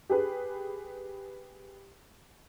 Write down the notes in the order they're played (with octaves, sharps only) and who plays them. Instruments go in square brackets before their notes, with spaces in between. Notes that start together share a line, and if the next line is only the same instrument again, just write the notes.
[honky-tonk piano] G4 G#4 B4